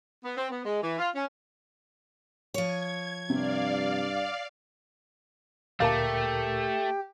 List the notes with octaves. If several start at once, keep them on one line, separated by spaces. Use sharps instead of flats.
B3
C4
B3
G#3
E3
F4
C#4
F3 C#5 G#6
G2 C3 D5 F5
D2 A#2 A3 G4 A#4 F5 A5